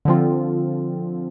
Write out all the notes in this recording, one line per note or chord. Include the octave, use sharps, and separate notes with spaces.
D3 F3 C4 F4